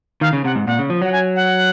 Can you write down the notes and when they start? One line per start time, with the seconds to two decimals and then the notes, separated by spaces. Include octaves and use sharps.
0.21 D#3 F5
0.33 C#3
0.44 C3 F#5
0.55 G#2
0.67 A#2 F#5
0.79 C#3
0.90 F3
1.02 F#3 F#5
1.12 G#5
1.36 F#5